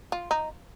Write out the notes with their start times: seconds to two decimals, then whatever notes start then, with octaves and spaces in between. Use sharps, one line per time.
0.12 F4
0.31 D#4